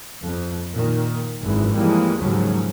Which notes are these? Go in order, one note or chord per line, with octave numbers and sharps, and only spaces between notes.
F2
A#2 D#3
G#1 F#2 E3 G#3
E3 F3 G3 G#3 A#3
D#2 G#2 C#3 F3 F#3